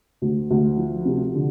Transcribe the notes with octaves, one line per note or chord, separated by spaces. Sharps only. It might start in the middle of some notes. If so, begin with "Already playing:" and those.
D2
D2
F3
C3
D3